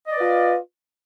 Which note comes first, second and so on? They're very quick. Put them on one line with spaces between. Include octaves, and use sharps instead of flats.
D#5 D5 B4 F4